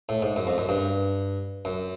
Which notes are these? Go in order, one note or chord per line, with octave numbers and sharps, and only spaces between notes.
A2
G#2
F#2
F2
F#2
G2
F#2